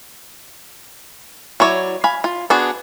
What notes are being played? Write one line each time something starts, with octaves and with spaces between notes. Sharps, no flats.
F#3 E4 C#5 D5
F5 G#5 B5
F4
B3 D4 F#4 G#4